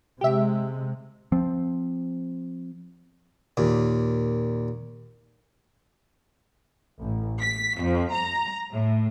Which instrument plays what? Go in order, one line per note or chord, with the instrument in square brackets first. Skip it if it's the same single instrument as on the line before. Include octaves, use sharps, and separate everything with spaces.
[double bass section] C3 G#3 [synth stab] G4 E5
[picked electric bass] F3 C4
[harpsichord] D#2 A#2
[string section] A1
B6
F2
A#5
A2